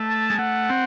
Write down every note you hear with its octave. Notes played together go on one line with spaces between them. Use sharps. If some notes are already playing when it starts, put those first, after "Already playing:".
Already playing: A3
A5
G#3
A3 F#5
C4